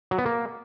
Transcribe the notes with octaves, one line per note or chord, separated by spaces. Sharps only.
F#3
B3
A#3